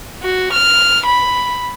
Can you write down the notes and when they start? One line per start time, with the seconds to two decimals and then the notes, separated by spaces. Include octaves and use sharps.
0.22 F#4
0.52 F6
1.06 B5